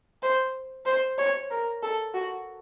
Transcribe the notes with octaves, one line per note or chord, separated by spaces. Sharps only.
C5
C5
C#5
A#4
A4
F#4